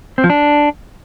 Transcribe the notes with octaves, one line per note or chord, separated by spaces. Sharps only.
C4
F3
D4